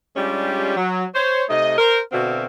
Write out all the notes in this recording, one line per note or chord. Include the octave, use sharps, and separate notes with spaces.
G3 G#3 C#4 D4 F4 G4
F#3
C5 C#5
C3 A3 D#4 D#5
A#4 C5
B2 D3 C4 F#4 E5 F5